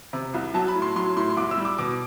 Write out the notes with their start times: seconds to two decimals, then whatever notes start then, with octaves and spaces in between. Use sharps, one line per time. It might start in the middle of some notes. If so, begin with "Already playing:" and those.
0.13 C3
0.34 C2
0.54 F#3 A5
0.68 B5
0.75 A2
0.82 C6
0.96 F#3 C6
1.16 A2 C6
1.30 C6
1.37 C2 D6
1.51 E6
1.58 G3
1.65 D6
1.78 B2 D6